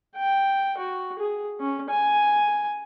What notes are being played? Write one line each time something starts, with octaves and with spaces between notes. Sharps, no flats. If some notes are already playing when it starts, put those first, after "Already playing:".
G5
F#4
G#4
C#4
G#5